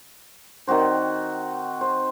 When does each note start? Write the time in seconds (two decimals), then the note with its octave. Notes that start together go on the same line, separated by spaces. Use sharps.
0.68 D#3 C4 F#4 C5
1.81 C5